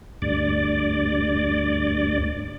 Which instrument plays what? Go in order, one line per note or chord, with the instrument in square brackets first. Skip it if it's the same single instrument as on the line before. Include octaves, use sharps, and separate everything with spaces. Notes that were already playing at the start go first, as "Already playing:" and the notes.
[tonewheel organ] D2 G2 D5